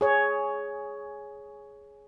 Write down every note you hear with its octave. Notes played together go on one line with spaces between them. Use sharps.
G#4 C#5